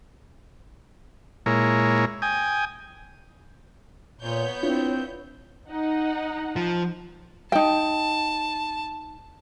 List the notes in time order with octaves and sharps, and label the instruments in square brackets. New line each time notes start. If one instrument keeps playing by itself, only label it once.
[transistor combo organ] A#2 G#3 E4 A#4 C#5
G5 G#5 D#6
[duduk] A#2 [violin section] B3 C#5 G6
[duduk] C4 [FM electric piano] D4 E4 F4
[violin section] D#4 F#5
[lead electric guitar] F3
[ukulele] D#4 G5 [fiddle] A5